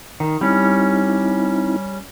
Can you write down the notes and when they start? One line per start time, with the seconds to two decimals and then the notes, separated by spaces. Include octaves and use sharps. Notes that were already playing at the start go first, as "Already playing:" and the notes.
0.20 D#3
0.41 G3 C4 C#4 D#4 E4